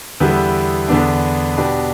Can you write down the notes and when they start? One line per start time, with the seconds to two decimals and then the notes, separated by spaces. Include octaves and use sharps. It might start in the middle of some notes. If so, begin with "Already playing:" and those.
0.20 E2 D3 G3 B3 E4
0.88 E2 D3 B3 D4
1.57 B2 B3 D4 G4